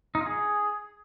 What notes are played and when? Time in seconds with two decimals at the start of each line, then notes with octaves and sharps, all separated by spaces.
0.15 D#4
0.21 F4
0.26 G#4